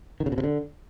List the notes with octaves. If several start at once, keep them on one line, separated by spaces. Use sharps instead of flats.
D#3
C#3
B2
C3
D3